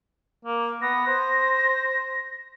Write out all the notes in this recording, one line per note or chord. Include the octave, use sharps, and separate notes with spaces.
A#3
B3 A#6
C5